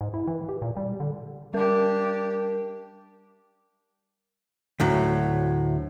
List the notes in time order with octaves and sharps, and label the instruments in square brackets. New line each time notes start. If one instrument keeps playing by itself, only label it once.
[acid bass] G#2
E4
E3
G4
A#2
G3
D3
[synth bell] G3 A#4 [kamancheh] D4 G4
[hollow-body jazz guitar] D2 A2 F#3